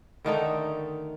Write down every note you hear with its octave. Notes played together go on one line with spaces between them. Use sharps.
D3 D#3 A3 D#4